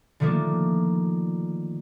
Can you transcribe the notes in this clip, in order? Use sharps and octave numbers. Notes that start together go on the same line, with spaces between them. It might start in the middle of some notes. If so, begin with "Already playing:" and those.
D3 D#3 F3 A3 A#3 D4